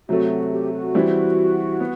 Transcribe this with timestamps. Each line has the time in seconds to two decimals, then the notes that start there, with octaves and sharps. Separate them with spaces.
0.08 C3 F#3 A3 F#4
0.30 F#4
0.51 G4
0.73 F#4
0.95 E3 G3 C4 E4
1.80 B3